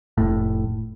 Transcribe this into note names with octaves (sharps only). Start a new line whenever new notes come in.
F1 A2